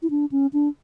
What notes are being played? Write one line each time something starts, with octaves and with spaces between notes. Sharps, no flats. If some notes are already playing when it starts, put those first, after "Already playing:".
E4
D4
C#4
D4